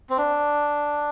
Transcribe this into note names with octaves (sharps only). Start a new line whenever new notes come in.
C4
D4